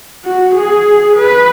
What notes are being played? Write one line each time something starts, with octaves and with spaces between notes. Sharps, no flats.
F#4
G#4
B4